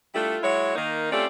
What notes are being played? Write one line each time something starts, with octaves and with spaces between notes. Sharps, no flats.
G3 A3 D4 E4 F4 A4
F#3 G#3 E4 C#5
D#3 A#3 D#4
A3 C4 C#4 F4 G4 D5